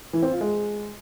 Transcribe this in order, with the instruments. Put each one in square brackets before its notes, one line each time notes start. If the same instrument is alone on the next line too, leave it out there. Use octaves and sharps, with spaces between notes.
[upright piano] E3
C4
F4
G#3